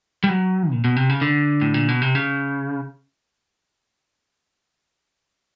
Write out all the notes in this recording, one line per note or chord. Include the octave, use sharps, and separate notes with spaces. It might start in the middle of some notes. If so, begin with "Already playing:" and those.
G3
F#3
A#2
B2
C3
C#3
D3
A2
A#2
B2
C3
C#3